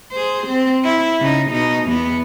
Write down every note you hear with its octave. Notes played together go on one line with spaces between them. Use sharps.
G#4 C5
C4
E4 E5
C#3 D#4
B2 D#4
E2 B3